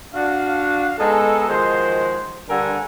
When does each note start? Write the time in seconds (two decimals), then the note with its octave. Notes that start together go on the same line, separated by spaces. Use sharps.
0.14 D4 F#4 F5
0.98 G#3 B3 D#4 A4
1.47 D#3 F3 G#3 F#4 C5
2.49 G2 D3 A4 A#4 F#5 G#5